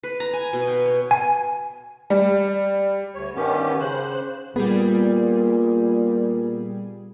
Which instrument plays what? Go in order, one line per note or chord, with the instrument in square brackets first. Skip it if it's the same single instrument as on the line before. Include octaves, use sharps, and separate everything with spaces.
[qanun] B4
A#5
G#5
B2
G5
C#5
[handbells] G#5
[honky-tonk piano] G3
[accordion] D2 C#5
G2 D#3 B3 C#4 G4
C#3 C5 F#6
[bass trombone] A#2 [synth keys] G3 G#4 [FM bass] B3